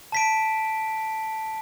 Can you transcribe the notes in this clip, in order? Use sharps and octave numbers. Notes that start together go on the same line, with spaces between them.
A5 B6 D7